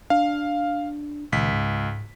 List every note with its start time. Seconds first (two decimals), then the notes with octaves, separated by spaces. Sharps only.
0.10 D4 F5
1.32 C#2 A#2 D#3 B6
1.52 G#2